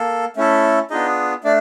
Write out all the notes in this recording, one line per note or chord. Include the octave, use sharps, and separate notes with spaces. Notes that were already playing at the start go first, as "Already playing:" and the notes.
Already playing: A#3 A4
A3 C#4 E4 A4
B3 D4 D#4 F4 G#4 D#5
A3 D4 D5